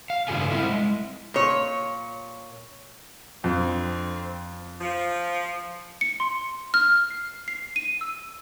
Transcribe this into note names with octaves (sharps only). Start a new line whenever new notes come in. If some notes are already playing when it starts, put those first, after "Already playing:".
F5
G2 C#3 F4 G4 A4 G#5
G3 C4 E4 E5
G#3
A#2 C#5
F2 D3 C4
F3
C#7
C6
F6
C7
C7
D#7
E6